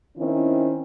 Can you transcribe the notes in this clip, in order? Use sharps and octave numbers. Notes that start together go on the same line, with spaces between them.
D#3 C4 C#4 E4